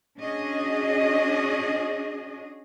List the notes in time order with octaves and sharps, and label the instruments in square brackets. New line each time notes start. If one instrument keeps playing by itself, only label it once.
[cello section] C#4 D4 F#4 G#4 D#5